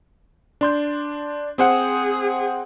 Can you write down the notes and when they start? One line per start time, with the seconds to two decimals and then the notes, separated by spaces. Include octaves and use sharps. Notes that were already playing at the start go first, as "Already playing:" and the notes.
0.61 D4 C6 G6
1.58 C4 G#4 C5 F#5